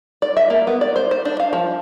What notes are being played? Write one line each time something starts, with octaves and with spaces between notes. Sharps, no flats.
D5
E5
A#3
B3
D5
C5
C5
D4
F5
F3